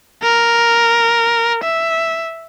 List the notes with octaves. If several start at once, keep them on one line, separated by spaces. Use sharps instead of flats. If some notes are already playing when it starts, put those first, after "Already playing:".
A#4
E5